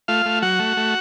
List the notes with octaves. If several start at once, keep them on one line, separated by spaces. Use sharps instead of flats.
A3 F4 F5
A3
F#3 F#4 F#5
A3
A3